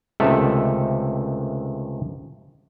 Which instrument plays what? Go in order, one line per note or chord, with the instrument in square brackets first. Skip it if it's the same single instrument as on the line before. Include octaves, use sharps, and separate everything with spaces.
[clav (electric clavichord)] C#2 C3 D#3 A3 A4 E5